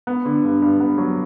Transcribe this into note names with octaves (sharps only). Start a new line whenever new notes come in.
B3
D3
G2
G2
B3
F#3